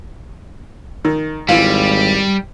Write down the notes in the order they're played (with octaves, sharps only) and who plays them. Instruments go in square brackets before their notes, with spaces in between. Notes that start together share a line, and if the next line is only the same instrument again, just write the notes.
[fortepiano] D#3
[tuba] G#1 [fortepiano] E3 F4 [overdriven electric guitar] G3